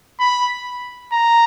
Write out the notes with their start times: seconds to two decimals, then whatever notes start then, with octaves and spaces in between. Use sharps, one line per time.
0.20 B5
1.12 A#5